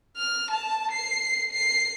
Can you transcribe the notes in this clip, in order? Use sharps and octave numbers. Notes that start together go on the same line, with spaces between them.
F6
A5
C7
C7